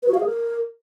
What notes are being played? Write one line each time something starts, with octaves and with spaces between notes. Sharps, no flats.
B4
F#4
F5
G#4
A#4